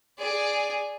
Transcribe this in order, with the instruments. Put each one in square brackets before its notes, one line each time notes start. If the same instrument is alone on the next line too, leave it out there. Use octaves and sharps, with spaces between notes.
[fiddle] G#4 D5